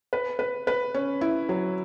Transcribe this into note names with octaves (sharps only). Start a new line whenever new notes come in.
B4
B4
B4
C#4
E4
F#3